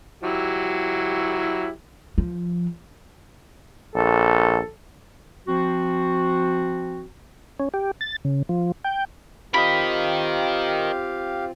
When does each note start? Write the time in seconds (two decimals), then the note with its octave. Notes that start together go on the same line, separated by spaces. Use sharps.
0.23 F#3 E4 G4
2.18 F3
3.95 A#1 A4
5.47 F3 C4 F#4
7.60 C#4
7.74 G4
8.01 A6
8.25 C#3
8.49 F3
8.84 G5
9.54 C4 F4 G4 A#4 D#5 F5 B5